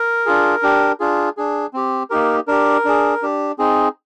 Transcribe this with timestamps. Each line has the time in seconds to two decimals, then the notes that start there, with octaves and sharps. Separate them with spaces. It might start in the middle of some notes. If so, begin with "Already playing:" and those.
Already playing: A#4
0.26 D4 F4 G#4
0.63 D4 G4
1.00 D4 F4 G#4
1.37 D4 G#4
1.74 C4 G4
2.10 A#3 D#4 G4 A#4
2.48 D4 G4 A#4
2.85 D4 G#4
3.23 D4 G4
3.59 C4 D#4 G#4